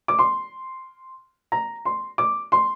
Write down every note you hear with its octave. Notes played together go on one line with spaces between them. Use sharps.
D6
C6
A#5
C6
D6
C6